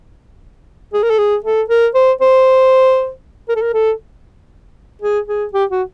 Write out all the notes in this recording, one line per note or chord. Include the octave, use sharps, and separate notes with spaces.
G#4
A#4
A4
G#4
A4
A#4
C5
C5
A#4
A4
A#4
A4
G#4
G#4
G4
F#4